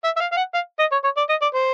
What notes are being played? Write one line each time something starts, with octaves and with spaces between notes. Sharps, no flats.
E5
E5
F5
F5
F#5
F5
D#5
C#5
C#5
D5
D#5
D5
C5